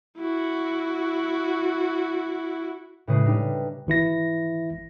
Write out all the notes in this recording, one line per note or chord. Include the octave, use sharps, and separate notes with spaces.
E4 F#4
A2 C#3 G#3 B4 D#6 C7
G3 D4 D#4
G#1 E3 E4 A#6